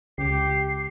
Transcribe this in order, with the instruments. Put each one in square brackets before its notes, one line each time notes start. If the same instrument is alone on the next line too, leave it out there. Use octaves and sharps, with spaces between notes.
[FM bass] C#2 [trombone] G4 [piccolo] C7